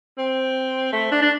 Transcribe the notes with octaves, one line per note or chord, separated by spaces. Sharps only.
C4
A3
D4
D4